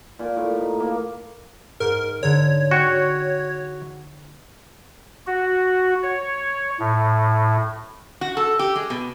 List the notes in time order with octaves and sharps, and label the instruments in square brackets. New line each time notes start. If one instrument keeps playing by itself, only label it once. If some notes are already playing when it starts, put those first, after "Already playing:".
[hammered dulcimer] A#2
A2
D#4
A#3
[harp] G#2 [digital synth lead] A#4
[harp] G#2 D3 [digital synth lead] C#5
[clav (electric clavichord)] F#4 [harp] G5 C#6
[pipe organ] F#4
C#5
A2
[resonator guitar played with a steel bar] F#4
A4
G4
G#3
B2